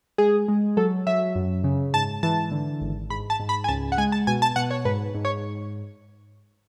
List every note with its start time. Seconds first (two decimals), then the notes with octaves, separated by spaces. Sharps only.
0.18 G#3 G#4
0.48 G#3
0.77 F#3 A4
1.07 F#3 E5
1.35 F#2
1.64 C#3
1.93 G#2 A5
2.23 E3 A5
2.52 D3
2.81 G#1
3.10 G#2 B5
3.30 A5
3.40 G#2
3.49 B5
3.64 G#5
3.68 C#2 A5
3.92 F#5
3.98 G#3 G#5
4.12 A5
4.27 B2 G#5
4.42 A5
4.56 B2 F#5
4.71 C#5
4.85 G#2 B4
5.15 G#2
5.25 C#5